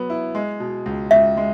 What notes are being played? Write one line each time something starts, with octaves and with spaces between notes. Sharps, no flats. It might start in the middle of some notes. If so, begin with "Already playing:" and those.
Already playing: F#3 B3
E4
G#3
B2
C#2
C#2 E5
G#3